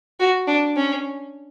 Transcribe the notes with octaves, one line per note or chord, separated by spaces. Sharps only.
F#4
D4
C#4